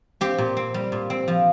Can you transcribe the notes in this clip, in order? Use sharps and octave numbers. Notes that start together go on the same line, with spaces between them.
C4 G4
A#2
C4
G3
A#2
C4
F3